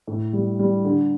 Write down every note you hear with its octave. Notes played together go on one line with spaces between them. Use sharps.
A2
G3
G3
D3